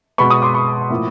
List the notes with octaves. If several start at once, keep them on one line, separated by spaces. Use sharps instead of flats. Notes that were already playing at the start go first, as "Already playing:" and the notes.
B2 G#3 B3 B5 C#6
C#6 D#6
C6 D6
B5 C#6
A2 F3 A#3